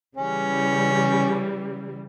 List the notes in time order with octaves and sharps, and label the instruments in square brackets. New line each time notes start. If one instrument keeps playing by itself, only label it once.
[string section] C#3 E3 G3 [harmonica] C#4